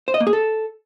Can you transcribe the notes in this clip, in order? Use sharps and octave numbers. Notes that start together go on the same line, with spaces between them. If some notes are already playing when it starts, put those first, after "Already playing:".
C5
D#5
A#3
G#4
A4